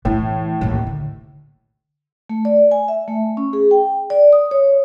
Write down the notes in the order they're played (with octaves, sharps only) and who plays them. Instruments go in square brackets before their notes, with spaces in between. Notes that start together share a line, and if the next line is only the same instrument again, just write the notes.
[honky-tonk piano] A2 [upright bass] E3 A3
[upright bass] A1 D#2
D3
[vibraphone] A3
D5
G#5
E5
A3
C#4
G#4
G5
D5
D#6
C#5